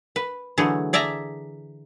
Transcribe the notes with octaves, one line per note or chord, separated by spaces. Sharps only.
B4
D3 E3 F#3 A3 G#4
G#4 D5 E5 A5 A#5